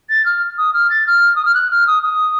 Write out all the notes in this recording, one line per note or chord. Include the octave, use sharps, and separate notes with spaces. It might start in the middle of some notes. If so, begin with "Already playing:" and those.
A6
F6
D#6
F6
A6
F6
D#6
F6
F#6
F6
D#6
D#6